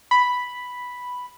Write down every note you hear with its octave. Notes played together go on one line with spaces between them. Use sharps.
B5